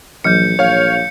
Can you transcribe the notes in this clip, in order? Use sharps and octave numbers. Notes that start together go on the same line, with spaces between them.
A#1 E3 F#3 G6 C#7
A#1 C#5 F5